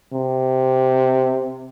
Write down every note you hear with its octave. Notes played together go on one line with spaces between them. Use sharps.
C3